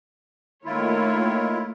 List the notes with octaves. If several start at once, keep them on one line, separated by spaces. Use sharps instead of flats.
D#3 A3 A#3 E4 F4 C#5